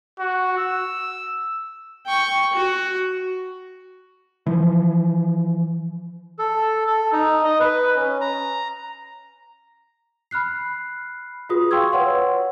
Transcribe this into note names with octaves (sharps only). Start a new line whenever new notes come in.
F#4
E6
G5 C#6
F#4
E3 F3
A4
A4
D#4
D#5
B4
C#4
A#5
B5 F6 F#6 C7
F4 F#4 G#4 B4 D#6
F5 G5 C6 C#6 E6 G#6
B4 C#5 F#5 C6